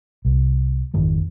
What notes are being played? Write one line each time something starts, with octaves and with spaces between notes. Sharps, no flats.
C2
G#1 F2 D#3 F3